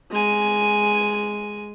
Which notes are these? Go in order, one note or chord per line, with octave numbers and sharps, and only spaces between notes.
G#3 G#5